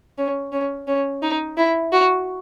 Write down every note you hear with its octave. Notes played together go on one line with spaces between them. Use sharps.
C#4
C#4
C#4
D#4
E4
F#4